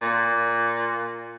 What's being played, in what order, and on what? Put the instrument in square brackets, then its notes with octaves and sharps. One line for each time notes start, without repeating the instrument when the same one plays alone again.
[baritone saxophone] A#2